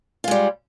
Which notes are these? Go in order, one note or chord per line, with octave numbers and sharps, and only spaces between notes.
G3 G#3 F4